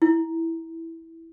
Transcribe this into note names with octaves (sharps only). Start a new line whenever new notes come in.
E4